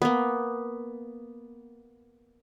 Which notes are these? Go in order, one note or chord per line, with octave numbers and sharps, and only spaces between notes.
A#3 B3